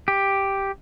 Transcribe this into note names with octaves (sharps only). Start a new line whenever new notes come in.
G4